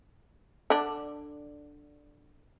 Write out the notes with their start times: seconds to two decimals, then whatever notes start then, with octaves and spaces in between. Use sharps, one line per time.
0.70 D3 D4